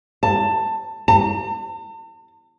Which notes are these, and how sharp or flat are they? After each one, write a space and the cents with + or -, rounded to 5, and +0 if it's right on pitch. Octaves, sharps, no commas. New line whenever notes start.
A5 +15
A5 +45